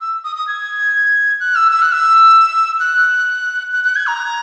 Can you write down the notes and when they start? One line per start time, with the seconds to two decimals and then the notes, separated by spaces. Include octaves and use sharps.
0.01 E6
0.24 D#6
0.36 D#6
0.48 G#6
1.40 F#6
1.56 E6
1.71 E6
1.82 F#6
1.92 E6
2.80 F#6
3.73 F#6
3.84 F#6
3.96 G#6
4.08 A#5